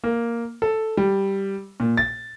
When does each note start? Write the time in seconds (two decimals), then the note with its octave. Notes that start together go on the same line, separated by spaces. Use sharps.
0.04 A#3
0.62 A4
0.97 G3
1.80 A#2
1.97 A6